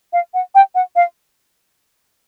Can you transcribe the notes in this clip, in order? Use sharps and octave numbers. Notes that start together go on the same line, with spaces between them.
F5
F#5
G5
F#5
F5